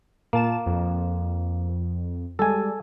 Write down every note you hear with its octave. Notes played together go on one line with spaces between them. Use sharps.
A#2 A#3 A5 E7
F2
G3 G#3 A4 G#5